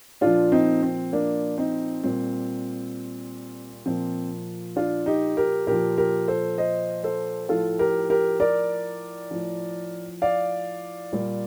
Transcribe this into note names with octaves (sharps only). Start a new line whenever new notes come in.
A#2 F3 D4 F4
C4 D#4
C4
A#3 D4
C4 D#4
A#2 G3 C4
A#2 F3 C4
D4 F4
D#4 G4
G4 A#4
A#2 F3 G4 A#4
G4 A#4
A4 C5
C5 D#5
A4 C5
A2 F3 F4 A4
G4 A#4
G4 A#4
A#4 D5
A2 F3
D5 F5
A#2 G3